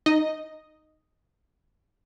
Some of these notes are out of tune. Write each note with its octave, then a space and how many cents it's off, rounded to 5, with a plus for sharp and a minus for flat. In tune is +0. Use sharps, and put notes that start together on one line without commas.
D#4 -5 D#5 +0